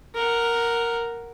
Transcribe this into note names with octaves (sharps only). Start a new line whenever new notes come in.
A#4 F#5